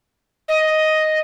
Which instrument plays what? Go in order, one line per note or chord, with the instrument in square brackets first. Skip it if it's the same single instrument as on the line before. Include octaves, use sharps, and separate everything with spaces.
[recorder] D#5